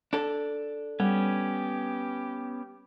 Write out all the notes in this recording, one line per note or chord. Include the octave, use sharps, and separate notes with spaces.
D4 A4
G3 B3 C#4 G4